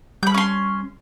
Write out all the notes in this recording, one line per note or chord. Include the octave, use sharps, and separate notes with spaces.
G3 B5 G6
C#4 C6